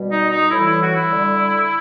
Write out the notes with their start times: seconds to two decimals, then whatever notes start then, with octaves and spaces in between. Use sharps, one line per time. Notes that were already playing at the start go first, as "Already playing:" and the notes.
Already playing: B2 G3
0.11 D#4
0.31 D#4
0.51 A2 E3 G3 E4
0.66 E4
0.81 F#4
0.95 E4
1.10 D3 G3